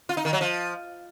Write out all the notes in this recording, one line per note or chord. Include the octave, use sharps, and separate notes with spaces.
F4
D#4
D#3
F#3
F3